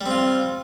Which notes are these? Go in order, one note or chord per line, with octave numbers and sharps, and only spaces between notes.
G3 C4 F4